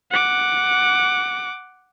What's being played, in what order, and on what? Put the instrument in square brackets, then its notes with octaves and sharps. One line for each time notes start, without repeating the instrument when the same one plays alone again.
[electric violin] F#5 D6